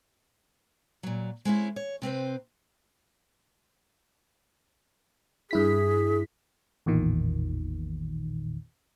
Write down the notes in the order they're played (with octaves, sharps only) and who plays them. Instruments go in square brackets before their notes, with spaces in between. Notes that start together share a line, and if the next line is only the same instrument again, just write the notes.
[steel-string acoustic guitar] A#2 F#3
G#3 C4 C#4 E4
C#5
C3 C4 B4 C5
[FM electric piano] G2 E4 B6 [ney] G#4
[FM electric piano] A1 E2 A#2 D#3